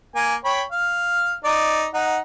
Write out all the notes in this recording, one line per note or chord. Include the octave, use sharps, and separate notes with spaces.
A#3 G#5
C#5 G5 B5
F5
D#4 D5
D#4 F#5